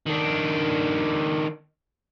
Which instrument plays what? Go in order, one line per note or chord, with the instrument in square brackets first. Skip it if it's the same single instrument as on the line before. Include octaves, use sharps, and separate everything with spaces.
[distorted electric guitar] D#3 D4